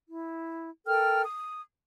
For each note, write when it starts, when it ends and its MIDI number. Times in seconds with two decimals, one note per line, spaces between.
0.09 0.69 64
0.86 1.22 69
0.86 1.22 70
0.86 1.22 79
0.86 1.22 89
1.24 1.62 87